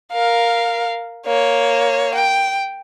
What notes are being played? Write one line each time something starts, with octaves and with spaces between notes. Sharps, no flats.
A#4 F5
A#3 C#5
G5